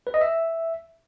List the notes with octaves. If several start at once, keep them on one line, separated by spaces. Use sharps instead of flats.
B4
D#5
E5